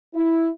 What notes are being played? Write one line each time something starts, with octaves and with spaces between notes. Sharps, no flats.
E4